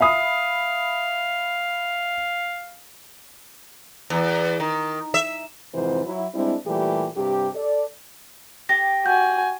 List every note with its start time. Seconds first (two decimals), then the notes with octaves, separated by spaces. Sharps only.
0.01 E5 F5 B5 D#6
4.10 E2
4.60 D#3
5.14 E5
5.75 F2 G#2 C3 E3 C5
6.06 F#3 E4
6.35 G3 G#3 C4 D4 E4
6.66 A#2 E3 G3 A3 G4
7.17 G2 C3 G4
7.55 A4 D5
8.69 G4 A#6
9.06 F#4 G#5 G6